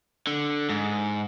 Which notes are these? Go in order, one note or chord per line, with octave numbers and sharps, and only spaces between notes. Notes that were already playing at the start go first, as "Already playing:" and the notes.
D3
G#2